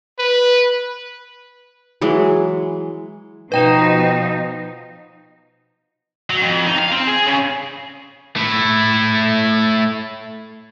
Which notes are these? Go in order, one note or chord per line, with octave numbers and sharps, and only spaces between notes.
B4
E3 F#3 G#3 G#4
B2 F3 D#4 B4 G5 E7
F#3
F2
D#4
F5
C4
G#4
C#3
A3 E4